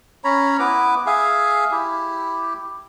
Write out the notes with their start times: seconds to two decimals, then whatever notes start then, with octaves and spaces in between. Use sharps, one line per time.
0.24 C#4 C#5 A#5 B5
0.59 B3 E4 B4 D6
1.06 G#4 E5 F5 G#5
1.71 E4 G4